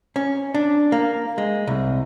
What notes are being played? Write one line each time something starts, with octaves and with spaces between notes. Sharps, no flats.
C#4
D4
A#3
G#3
C2